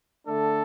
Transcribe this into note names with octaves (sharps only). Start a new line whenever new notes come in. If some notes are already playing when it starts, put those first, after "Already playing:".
D3 A3 D4 A4